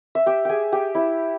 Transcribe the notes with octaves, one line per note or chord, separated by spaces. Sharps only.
E5
G4 G5
G#4 G5 G#5
G4 G5
E4 E5